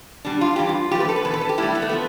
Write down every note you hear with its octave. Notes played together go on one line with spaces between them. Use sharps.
B2 G3 D4
F4
G2 E3 G3 G4
F4
G2 F3 A3 G4
B4
A4
B4
E2 B2 A4
B4
A4
G4
A2 G3 E4
B3
A3
F3 B3